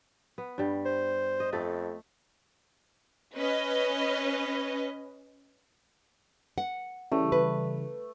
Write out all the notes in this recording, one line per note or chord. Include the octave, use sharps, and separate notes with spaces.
B3
G2 G3
C5
D#5
F2 A3 A4
C#4 B4 D#5
F#5
C#3 E3 G3 A3
B4